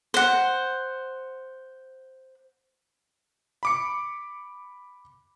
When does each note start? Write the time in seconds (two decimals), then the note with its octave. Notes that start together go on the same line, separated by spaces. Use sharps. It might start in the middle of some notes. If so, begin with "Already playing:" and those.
0.14 C5 F#5
3.63 B5 D6 C#7